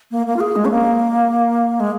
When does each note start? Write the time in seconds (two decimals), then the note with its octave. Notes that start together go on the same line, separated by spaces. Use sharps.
0.11 A#3
0.26 A#3
0.36 F4
0.40 G#4
0.56 G#3
0.65 C#4
0.71 A#3
1.80 G#3